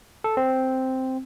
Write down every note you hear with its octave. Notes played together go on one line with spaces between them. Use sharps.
A4
C4